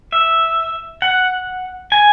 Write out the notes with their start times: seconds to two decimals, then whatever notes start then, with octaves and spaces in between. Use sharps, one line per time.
0.12 E5
1.02 F#5
1.92 G#5